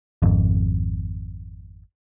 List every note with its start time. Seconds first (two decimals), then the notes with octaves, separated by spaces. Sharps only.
0.22 G#1 F2